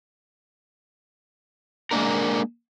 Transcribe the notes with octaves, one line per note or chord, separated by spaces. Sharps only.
G#3 A#3 D4 A#4